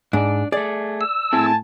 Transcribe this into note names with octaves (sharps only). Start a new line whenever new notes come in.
G#2 D4 D5
A3 G#4 D5
E6
A2 C4 E4 G#4 G#5 A5